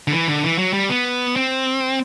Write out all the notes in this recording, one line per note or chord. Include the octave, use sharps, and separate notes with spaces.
D3
E3
D3
E3
F#3
G3
B3
C4